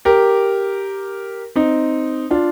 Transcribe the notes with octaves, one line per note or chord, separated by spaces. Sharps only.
G4 A#4
C4 D#4
D4 F4